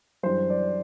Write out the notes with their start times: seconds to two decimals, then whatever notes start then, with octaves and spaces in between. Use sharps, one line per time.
0.23 F#2 E3 G3 D4 C5
0.50 D5